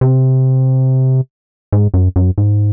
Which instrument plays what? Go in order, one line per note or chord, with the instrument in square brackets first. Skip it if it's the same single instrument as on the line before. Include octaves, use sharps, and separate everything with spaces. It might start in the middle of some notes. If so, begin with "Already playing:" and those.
[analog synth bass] C3
G#2
F#2
F#2
G#2